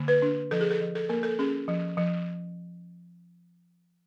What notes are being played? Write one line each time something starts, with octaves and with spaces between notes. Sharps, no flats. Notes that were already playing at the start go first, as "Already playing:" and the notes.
Already playing: D3 A#3
B4
D4
F3 A4
G#4
A4
F3
A4
A#3 A#4
A4
C#4 G#4
F3
F3